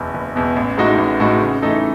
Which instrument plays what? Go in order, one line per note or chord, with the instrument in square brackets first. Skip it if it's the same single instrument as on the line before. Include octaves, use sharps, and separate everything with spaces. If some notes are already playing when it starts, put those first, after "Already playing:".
Already playing: [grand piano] F#1 E2 B2
F#1
E2 B2
A1
A2 G#3 D#4 F#4
A1
A2 G#3 D#4 F#4
C#3
E3 A3 D#4 A4